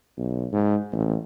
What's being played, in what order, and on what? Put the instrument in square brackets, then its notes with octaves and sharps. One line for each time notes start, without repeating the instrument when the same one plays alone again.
[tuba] B1
G#2
A1